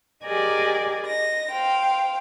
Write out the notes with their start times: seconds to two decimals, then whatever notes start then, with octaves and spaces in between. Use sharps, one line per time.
0.25 G4 G#4 A#4 D5 D#5 G#5
1.05 D#5 A#6
1.52 C5 F5 G5